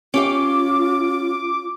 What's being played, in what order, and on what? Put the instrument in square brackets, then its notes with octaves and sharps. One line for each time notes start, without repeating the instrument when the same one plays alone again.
[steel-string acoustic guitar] C#4 G4 F5 [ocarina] F4 [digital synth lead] D6